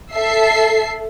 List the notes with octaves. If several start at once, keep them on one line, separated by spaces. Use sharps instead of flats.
A4 E5 C7